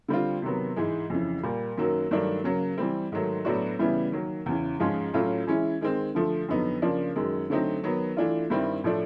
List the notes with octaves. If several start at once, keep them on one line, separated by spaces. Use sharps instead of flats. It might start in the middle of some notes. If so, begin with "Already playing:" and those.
D3 G3 C4 F4
C3 D#3 F#3 B3
G#2 E3 G#3
F2 C#3 E3
A#2 G3 A#3
F#2 D#3 F#3 A#3
G2 D#3 F#3 A3 D4
C#3 F#3 A#3
E3 G3 C4
G#2 D#3 F#3 A3
A2 F#3 B3 D4 F#4
C#3 E3 G3 B3 E4
D#3 F#3 A#3
E2 C#3 E3
G#2 F3 G#3 C#4 F4
A2 F#3 A3 C#4 F4
E3 G#3 C#4 E4
D#3 G#3 C4
D3 F3 A3
F2 D3 F#3 B3 D#4
C#3 F3 A#3 D4
F#2 D#3 G#3
D3 F#3 A3 C4 D#4
D#3 F#3 B3
E3 A3 D4 F4
G2 D#3 G3 C4 E4
A2 F3 A3 D4